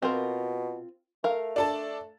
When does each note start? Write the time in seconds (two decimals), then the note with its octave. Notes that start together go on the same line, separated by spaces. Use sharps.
0.02 B2 C4 F4 A#4
1.24 A3 A#4 F5
1.56 D4 A4 A5